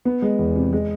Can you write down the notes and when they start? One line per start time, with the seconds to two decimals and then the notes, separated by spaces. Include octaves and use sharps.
0.05 B3
0.22 G#3
0.39 E2
0.55 C3
0.73 G#3